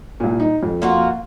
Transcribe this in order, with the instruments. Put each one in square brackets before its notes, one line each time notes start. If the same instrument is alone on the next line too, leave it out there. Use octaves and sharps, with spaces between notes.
[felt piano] C2 A#2
D#4
F2
[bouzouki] A#3 F4 F#4